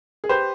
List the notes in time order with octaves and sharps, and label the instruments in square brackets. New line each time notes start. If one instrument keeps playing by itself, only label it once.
[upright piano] G#4
[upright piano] G4 B4 [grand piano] C5